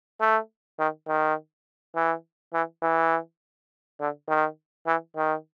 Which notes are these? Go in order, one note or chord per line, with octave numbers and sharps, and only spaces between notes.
A3
D#3
D#3
E3
E3
E3
D3
D#3
E3
D#3